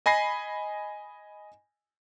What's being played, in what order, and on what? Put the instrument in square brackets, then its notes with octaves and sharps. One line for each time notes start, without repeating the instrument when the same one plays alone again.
[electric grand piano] D#5 G#5 B5 A#6 C7